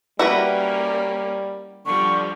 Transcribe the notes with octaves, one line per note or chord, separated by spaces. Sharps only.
G3 A#3 C#4 E4 F#4 B4
D3 F3 G3 C#6